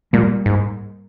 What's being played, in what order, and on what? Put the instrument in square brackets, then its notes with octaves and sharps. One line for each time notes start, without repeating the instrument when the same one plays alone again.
[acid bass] A#2 [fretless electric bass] G3 A#3
[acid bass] G#2